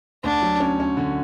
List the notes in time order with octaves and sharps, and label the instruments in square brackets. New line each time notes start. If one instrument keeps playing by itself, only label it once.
[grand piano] D2 [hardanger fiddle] D4
[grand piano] F#3
C#4
C#4
D3